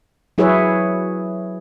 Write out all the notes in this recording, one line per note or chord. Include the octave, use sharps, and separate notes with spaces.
F#3 E4 G#4 B4 C#5 E5